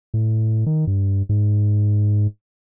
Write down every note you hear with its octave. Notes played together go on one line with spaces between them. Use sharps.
A2
D#3
G2
G#2